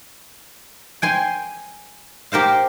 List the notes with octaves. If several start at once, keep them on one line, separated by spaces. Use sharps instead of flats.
G5 G#5 C6
G4 A#4 C5 F5